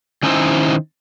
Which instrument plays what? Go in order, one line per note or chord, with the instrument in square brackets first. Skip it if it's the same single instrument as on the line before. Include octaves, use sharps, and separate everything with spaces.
[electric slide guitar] D#3 C#4 D#4 E4 C5